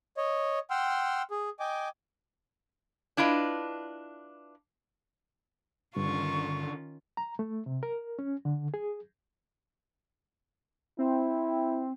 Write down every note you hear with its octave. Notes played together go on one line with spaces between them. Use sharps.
C#5 D#5
F#5 G5 C6 E6 F6
G#4
D#5 G5 G#5 D6
D4 E4 F4 B4 D#5
G2 D3 D#3 C#4 F4 C#6
A#5
A3
C3
A#4
C#4
D3
G#4
C4 E4